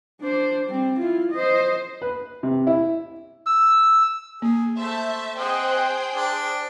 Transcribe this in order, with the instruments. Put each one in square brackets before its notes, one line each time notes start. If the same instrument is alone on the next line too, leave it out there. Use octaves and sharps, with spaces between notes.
[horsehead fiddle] D4 C5
G3 C4
E4 F4
C5 D#5
[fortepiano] B4
C3
E4
[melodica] E6
[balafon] A#3 [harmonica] G#4
[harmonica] A3 C5 [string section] E5 A5
[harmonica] C4 D#5 F#5 [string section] G#4 C5 G5
[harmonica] D4